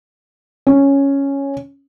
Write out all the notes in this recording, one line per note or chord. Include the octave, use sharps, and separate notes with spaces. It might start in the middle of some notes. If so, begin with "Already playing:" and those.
C#4